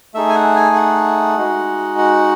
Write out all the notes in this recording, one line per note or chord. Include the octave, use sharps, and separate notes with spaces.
A3 D#4 G#4 E5
G#5
F#5
G#5
F#5
G#3 D#4 F#4
F#5